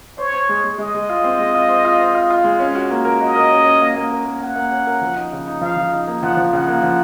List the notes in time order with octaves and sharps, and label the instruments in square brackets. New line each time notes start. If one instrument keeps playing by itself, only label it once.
[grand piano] C5 [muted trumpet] C#5
[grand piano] C5
G#3
G#3
[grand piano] G#3 [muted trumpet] D#5
[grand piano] G#3
F4
C4
G#3
F4
C5
F4
C5
F4
F4
G#3
C#4
F#4
A#3
A#4
[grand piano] F#4 [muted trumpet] D#5
[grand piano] A#4
C#4
C#4
A#3
A#3
A#4
A#3
[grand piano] A#3 [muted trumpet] F#5
[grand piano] A#3
C#4
A#4
F3
D#4
C#3
D#4
[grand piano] F3 [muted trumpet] F5
[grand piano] F3
D#4
A#3
[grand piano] F3 [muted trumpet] F#5
[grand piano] F3
[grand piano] C#3 [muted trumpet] F#5
[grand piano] A#3
F3